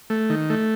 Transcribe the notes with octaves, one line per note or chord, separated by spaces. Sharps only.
A3
D#3
A3